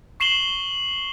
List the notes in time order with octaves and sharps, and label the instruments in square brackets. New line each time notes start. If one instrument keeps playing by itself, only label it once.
[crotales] C#6 C7 E7 F#7 G7